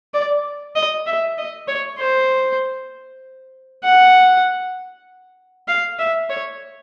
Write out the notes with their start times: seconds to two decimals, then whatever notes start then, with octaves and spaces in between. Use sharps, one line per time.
0.14 D5
0.76 D#5
1.07 E5
1.38 D#5
1.68 C#5
1.99 C5
3.84 F#5
5.68 F5
5.99 E5
6.30 C#5